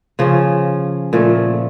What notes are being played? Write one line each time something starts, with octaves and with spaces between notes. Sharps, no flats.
C#3 F3 C#4
A#2 F3 A3